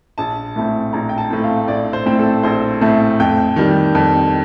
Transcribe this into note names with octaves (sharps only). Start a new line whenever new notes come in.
A#1 A5
A2 A3 C4
A#1 A#5
G5
A5
A2 A3 C4
F5
A#1 D5
C5
A2 A3 C4
A4
A#1 C5
A2 A3 C4
F2 G5
D#3 G3
F2